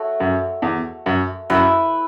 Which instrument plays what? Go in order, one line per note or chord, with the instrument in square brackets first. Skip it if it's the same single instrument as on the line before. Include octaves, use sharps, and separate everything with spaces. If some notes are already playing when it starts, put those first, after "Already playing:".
Already playing: [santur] A3 F#4 C#5
[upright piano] F#2
E2
F#2
[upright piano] F#2 [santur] E4 B4 E5